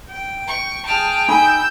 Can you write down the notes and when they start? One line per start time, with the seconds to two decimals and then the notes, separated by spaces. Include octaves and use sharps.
0.10 G5
0.47 C#6
0.86 G#4 G5 A5 F6
1.28 D#4 G#5 B5 E6 G6